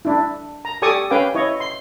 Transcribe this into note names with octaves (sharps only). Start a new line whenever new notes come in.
D4 E4
A#5
G4 A4 D5 G#5 C#6 D#6
C#4 B4 F5 G5 G#5 D6
E4 C#5 D#5
C6